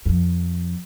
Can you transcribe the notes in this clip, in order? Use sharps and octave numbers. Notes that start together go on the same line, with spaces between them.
F2 F3